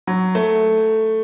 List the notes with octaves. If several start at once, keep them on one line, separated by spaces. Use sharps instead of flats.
F#3
A3